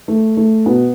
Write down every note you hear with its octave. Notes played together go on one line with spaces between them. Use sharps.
A3
A3
B2 B3